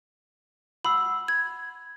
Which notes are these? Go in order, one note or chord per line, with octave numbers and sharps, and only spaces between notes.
F#5 B5 C6 E6
G#6